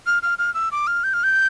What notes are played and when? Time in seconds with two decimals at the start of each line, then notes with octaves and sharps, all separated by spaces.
0.06 F6
0.23 F6
0.38 F6
0.54 E6
0.72 D6
0.87 F6
1.04 G6
1.14 F6
1.24 G6